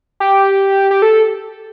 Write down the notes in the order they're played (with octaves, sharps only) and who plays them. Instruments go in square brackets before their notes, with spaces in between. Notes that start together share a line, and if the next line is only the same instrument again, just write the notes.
[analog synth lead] G4
G4
A4